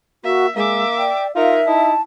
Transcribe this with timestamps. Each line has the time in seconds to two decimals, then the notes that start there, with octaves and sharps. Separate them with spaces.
0.24 A#3 F#4 E5
0.56 G#3 A#3 E5 D6
0.98 D5 G5
1.35 D#4 F4 A#4 E5 F5
1.67 D#4 E4 A5